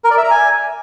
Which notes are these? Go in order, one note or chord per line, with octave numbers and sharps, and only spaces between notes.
A#4
D5
E5
A#5
G#5